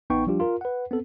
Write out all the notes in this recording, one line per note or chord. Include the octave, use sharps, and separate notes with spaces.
A1 B3 D#4 G5 C#6
F3 G3 D4 F4 G4
F4 A#4
B4 F#5
B3 C4 A4